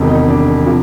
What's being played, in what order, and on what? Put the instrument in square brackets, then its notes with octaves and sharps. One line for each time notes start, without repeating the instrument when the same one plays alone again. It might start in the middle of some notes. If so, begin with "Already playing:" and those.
Already playing: [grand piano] E1 E2 C3 D#3
D#4
D4
C3 F3